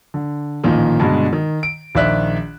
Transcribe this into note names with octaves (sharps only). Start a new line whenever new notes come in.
D3
A1 A#2 D#3 F3
G2 B2 D3 G#3
D#3
D7
A#1 D#3 D5 E5 F#6